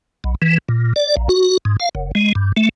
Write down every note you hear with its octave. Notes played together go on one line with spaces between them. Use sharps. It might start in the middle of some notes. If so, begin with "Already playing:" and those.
B1
E3
A#2
D5
A#1
F#4
G#2
F5
F#1
G#3
G2
A3